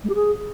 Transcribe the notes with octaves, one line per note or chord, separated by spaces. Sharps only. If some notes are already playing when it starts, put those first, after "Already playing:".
G#3
G4
G#4